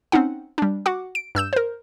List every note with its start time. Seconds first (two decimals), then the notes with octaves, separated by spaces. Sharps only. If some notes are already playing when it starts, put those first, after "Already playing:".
0.12 C4 C#4 D#4 F#5
0.58 G3 D4
0.86 F#4 F#5 D6
1.15 D7
1.35 G2 E6 G6 E7
1.53 A#4 C5